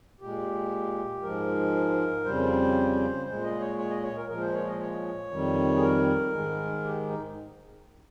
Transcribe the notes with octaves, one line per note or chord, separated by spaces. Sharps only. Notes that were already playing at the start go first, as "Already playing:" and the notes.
A#2 G#3 G4
G#2 F3 G#3 A#4
F2 C#3 G3 C5
A#2 G#3 C5
D#5
C#5
C#5
D#5
C#5
A#4
A#2 F3 G#3 A#4
C5
C#5
D#5
C#5
F2 D#3 G3
G#4
A#4
G#2 D#3 G#3
G4
D#4